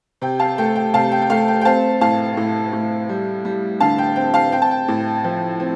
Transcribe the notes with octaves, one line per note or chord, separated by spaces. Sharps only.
C3 G5
F5 A5
A3 G5
G5
C3 F5 A5
G5
G5
A3 F5
G5
G5
C4 F5 A5
A2 F5 A5
A2
A2
G3
G3
D3 F5 A5
G5
C4 G5
F5 A5
C4 G5
A5
G5
A2
F3
C4